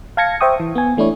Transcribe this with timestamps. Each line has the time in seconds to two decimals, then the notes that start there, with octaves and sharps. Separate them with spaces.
0.17 F5 A5 G#6 A#6 C#7
0.41 C5 E5 G5 C#6 D#6
0.60 E3
0.75 B3 G#5
0.97 E3 A3 D4 E4 C#5